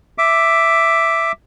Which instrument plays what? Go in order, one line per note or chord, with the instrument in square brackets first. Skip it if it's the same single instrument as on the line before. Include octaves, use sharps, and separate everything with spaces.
[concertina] E5 D6